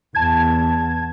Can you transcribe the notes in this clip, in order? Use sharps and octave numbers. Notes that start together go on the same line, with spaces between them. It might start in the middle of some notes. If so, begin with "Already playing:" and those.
E2 A5 G#6